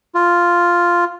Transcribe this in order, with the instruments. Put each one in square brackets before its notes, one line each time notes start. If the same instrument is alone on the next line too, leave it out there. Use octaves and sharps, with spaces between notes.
[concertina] F4